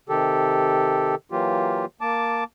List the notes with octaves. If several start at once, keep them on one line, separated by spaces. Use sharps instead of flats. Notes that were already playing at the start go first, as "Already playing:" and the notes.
C3 D#3 G4 A4
E3 F#3 A#3 F4 G4
A#3 A5 D6